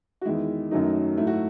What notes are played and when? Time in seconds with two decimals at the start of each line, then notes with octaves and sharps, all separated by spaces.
0.21 F#4
0.25 E2 D#3 G#3 E4
0.71 F#2 D#3 F#3 A3 D#4
1.17 G#2 F#3 A3 E4
1.27 F#4